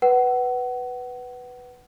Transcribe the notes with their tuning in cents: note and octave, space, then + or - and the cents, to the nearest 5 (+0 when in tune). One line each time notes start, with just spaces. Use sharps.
B4 +0 F#5 +25